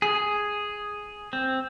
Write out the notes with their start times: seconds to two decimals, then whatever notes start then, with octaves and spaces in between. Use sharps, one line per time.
0.02 G#4
1.33 C4